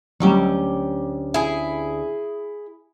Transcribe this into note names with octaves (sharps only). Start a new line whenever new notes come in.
D2 D#3 F#3 G3 C#4 G4
E4 G#4